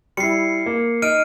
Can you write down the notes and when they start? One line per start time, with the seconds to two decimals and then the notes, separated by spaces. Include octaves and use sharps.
0.17 G3 E4 C7 C#7
0.66 A#3
1.02 D#4 F6 D7 D#7